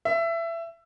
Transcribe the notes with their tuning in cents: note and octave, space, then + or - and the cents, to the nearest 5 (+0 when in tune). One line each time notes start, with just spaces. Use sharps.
E5 +20